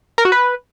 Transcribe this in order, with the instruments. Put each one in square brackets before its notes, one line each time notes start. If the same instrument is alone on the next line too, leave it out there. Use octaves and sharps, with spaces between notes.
[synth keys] A#4
F#4
B4